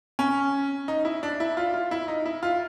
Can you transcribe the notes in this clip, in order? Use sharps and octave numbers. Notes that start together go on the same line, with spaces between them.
C#4
D#4
E4
D4
E4
F4
F4
E4
D#4
E4
F4